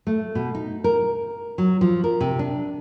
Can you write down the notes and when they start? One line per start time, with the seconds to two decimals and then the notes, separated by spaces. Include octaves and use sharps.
0.07 A3
0.35 B2
0.55 D#4
0.84 A#4
1.58 F#3
1.81 F3
2.04 A#4
2.20 C3
2.39 D4